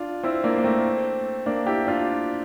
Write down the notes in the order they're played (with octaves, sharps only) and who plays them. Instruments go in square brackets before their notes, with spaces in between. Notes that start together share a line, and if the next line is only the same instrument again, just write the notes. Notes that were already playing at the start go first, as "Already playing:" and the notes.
Already playing: [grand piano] D4 F4
C4 E4
A#3 D4
A#3
A3 C4
A#3 D4
E4 G4
D4 F4